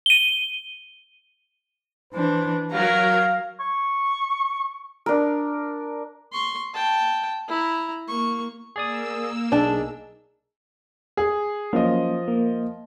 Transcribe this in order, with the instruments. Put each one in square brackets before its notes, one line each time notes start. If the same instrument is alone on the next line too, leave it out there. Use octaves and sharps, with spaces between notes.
[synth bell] D#7 G7
[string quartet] E3 D4 [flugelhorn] C5
[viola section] F#3 A#4 [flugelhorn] F5 [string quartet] A#5
[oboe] C#6
[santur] D4 A#4
[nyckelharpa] C6 C#6
G5 A5
E4 A#5
A#3 C#6
[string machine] A#3 E6 [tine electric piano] G#4 D5 D#6
[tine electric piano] B1 [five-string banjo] D4 A5 [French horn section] D#4 G#4
[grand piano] G#4
[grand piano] F3 D#5 [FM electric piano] F#3 A#3 C#4
[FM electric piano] A#3